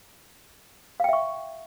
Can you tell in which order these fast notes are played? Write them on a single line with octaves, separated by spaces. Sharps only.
F5 G5 E5 C#6